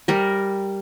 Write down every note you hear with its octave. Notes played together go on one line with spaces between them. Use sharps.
G3 A#4